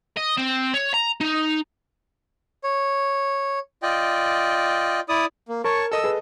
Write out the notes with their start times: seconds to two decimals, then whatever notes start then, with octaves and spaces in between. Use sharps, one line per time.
0.17 D#5
0.38 C4
0.74 C#5
0.94 A#5
1.21 D#4
2.64 C#5
3.83 F4 D5 D#5 G5
5.09 E4 D5 D#6
5.48 A#3
5.64 A#4 C#5 A5 C#6
5.92 A4 D#5 D#6 E6
6.04 G#4 B4